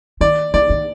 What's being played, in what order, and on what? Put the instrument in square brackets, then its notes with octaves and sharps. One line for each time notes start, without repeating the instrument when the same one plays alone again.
[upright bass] D#3 [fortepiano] D5
[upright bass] D#3 [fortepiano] D5
[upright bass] D#3